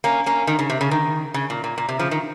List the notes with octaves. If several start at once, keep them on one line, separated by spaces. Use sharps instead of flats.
A#3 C#4
A#3 C#4
D#3
C#3
C3
C#3
D#3
C#3
A#2
A#2
A#2
C3
C#3 F3
D#3